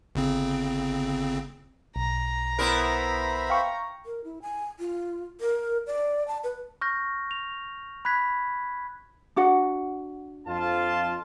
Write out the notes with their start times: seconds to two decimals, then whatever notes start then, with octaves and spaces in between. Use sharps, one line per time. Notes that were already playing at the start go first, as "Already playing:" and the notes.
0.15 G1 C#3 C4
1.96 B1 A#5
2.59 B3 E4 A#4 C5 E5 B5
3.50 F5 G5 C#6
4.06 A#4
4.24 E4
4.42 G#5
4.79 F4
5.40 A#4
5.87 D5
6.28 A5
6.44 B4
6.81 C#6 F6 G6 A#6
7.31 F7
8.05 B5 F#6 G#6 B6
9.36 D4 F#4 F#5
10.47 F2 F4 A5